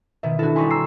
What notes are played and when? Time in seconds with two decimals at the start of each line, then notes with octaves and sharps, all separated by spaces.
0.23 B2 D#3 E5
0.39 D4 E4 F#4 A4
0.56 G3 D#4 E4 G#5 C6 C#6
0.71 A#5 E6 C7